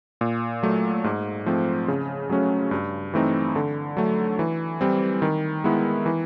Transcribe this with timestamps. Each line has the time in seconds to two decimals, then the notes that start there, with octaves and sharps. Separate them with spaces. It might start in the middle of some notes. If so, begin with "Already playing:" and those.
0.21 A#2
0.63 F#3 A3
1.04 G#2
1.46 F3 A3 C4
1.88 C#3
2.29 F#3 A3 C#4 F#4
2.71 G2
3.14 E3 A3 C4 D#4
3.56 D3
3.97 F#3 A3
4.39 E3
4.81 G3 C4
5.22 D#3
5.64 G#3 B3 E4
6.06 E3